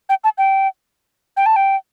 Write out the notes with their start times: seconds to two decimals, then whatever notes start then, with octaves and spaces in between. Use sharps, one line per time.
0.09 G5
0.24 A5
0.38 G5
1.37 G5
1.46 A5
1.56 G5